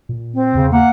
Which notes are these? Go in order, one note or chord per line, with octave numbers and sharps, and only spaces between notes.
A#2
C4
E2 C#3
A#3 F#5